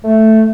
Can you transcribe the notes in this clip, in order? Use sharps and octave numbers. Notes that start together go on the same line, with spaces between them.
A3